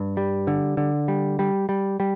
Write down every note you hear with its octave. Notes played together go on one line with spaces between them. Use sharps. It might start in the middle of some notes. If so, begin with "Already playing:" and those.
Already playing: G2
G3
D3
D3
G3
G3
G3
G3